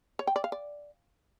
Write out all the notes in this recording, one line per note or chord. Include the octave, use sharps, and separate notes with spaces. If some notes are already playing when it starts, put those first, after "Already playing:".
C#5
G5
D5
F5
D5